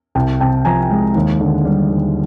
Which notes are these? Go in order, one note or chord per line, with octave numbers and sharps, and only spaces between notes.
C2 G5 A5
C3 G5 A5
F3 G#5 A#5
G#3
D#2
D3
G3
D#2